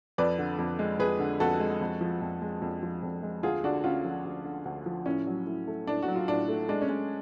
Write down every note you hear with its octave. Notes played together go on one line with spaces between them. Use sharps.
F2 B4 D5
D3
F2
G#3
F2 G#4 B4
D3
F2 F#4 A4
G#3
F2
F3
F2
G#3
F2
F3
F2
G#3
D2 F4 G#4
D3 D4 F#4
D2 C#4 F4
F3
D2
D3
D2
F3
A2 C#4
F#3
A2
A3
A2 D4
F#4
F#3
F4
A2 D4
A3
G#3 D4
C#4
G#3